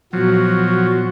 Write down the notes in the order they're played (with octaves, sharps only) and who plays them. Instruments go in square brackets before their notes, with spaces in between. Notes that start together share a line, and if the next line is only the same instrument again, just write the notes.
[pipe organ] A#2 B3 [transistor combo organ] F3 F#3 [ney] F#4